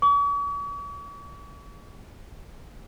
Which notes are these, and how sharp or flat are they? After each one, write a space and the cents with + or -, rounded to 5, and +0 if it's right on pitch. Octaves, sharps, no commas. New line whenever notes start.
C#6 +45